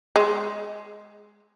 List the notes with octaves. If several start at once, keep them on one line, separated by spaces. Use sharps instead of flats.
G#3